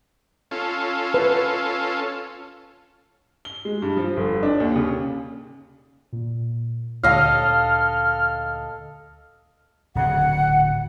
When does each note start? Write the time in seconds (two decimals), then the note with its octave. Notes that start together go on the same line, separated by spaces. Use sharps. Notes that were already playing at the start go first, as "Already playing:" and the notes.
0.51 C#4 F4 A4
1.14 B4
3.45 G7
3.65 G#3
3.82 G2
3.97 F3
4.17 G1
4.43 D4
4.60 D#2
4.76 C#3
6.13 A#2
7.03 D2 A#2 D3 A4 D#5 F5 F6
9.95 D1 C#3 F#5